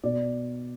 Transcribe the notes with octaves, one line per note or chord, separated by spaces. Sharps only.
B2 D5